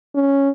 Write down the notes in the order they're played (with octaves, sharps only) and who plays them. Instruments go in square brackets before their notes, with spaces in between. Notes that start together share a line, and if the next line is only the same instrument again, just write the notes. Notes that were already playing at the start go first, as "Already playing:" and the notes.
[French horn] C#4